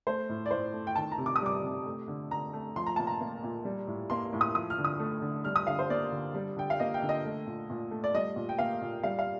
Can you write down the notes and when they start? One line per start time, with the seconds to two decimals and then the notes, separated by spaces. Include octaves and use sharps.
0.07 A3 C5
0.29 A2
0.46 D5
0.51 A2 C5
0.73 A3
0.87 G5
0.96 D#3 A5
1.12 A#5
1.18 C3
1.26 D6
1.36 D#6
1.42 G3 D6
1.63 C3
1.86 A3
2.08 D3
2.31 D3 A#5
2.53 A3
2.76 F3 C6
2.86 A#5
2.96 A#2 A5
3.07 A#5
3.21 A#3
3.44 A#2
3.65 G3
3.87 A2
4.10 A#3 C6
4.33 A2
4.41 D#6
4.55 F3 D#6
4.70 F6
4.78 D3
4.84 D#6
4.99 A3
5.22 D3
5.45 G3 F6
5.56 D#6
5.67 D3 F5
5.79 C5
5.90 A#3 D5
6.12 D3
6.34 G3
6.57 D3 G5
6.70 F5
6.80 A#3 D#5
6.94 G5
7.02 D3
7.09 D#5
7.25 A3
7.47 A#2
7.70 A#2
7.91 A3
8.04 D5
8.14 G3 D#5
8.36 A#2
8.49 G5
8.59 A#3 F5
8.81 A#2
9.03 G3 F5
9.19 F5